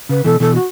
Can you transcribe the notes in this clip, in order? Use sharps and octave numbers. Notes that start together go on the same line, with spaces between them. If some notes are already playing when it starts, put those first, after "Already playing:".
C#3 B4
B2 E3 A4
B2 E3 A4
F#4